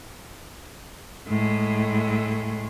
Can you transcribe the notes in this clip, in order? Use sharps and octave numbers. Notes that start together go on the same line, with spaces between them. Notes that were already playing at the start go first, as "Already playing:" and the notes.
A2 G#3